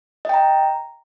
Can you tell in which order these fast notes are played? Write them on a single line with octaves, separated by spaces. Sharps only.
D#5 G5 A#5